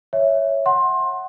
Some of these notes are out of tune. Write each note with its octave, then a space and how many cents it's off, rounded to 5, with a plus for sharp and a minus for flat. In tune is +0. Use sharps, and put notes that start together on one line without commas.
C#5 +0 E5 +0
F#5 +5 C6 +20